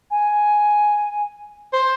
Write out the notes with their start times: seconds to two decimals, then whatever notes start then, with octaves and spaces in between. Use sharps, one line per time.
0.11 G#5
1.73 C5